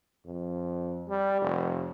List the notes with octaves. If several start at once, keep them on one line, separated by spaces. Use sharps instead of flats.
F2
G3
F1